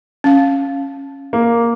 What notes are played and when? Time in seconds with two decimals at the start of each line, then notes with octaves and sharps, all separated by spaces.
0.24 C#4 F5
1.33 A#3